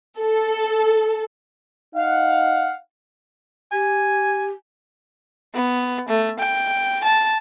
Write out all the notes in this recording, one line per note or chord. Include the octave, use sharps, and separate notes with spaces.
A4
D#4 F5 F#5
G4 G#5
B3
A3
G5
A5